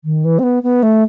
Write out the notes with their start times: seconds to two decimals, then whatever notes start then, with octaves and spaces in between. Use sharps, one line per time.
0.04 D#3
0.24 E3
0.39 C4
0.43 B3
0.63 B3
0.82 A3